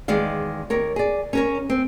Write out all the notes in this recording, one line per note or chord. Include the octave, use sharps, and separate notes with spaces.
E2 D#3 G#3 D5 F5
D#2 A#4 C#5
G#4 D5
C#4 A#4 C#5
C4